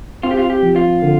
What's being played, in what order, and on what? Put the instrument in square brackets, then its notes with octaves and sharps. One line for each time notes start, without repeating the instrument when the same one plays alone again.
[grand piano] C4 [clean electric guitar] F4
[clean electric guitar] G4
F4
G4
[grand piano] F3
[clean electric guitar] F4
[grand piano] D3